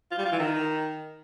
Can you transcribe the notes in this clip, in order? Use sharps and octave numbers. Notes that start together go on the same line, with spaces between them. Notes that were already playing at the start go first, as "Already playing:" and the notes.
F4
G3
F4
E3
D#3